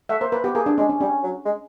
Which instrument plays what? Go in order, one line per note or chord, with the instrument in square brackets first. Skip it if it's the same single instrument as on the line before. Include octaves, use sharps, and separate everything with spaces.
[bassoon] A3 [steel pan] E5 F#5
[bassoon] A#3 [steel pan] C5
[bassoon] A#3 [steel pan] B4
[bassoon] B3 [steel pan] G4
[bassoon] A#3 [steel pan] G#4
[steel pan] D4
[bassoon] G#3 [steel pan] C#4
[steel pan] C#4
[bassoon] G3 [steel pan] C#4
[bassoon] F#3
G#3